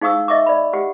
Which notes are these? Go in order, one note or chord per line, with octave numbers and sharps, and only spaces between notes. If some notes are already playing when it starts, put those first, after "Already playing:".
D#4 G#4 F5 C#6 D#6 E6
D#5 E5 C#6 D6
D5 B5
G4 F#5